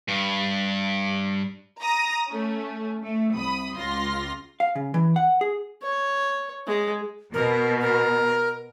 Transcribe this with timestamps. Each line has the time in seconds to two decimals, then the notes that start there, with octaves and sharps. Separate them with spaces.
0.08 G2
1.82 A#5 D#6 A#6
2.28 A3 C#4
3.02 A3
3.35 C2 B5 D#6
3.77 C#2 F4 C6 A#6
4.60 F5
4.75 C#3
4.94 E3
5.16 F#5
5.41 G#4
5.83 C#5
6.67 G#3
7.34 B2 A#4
7.80 A#4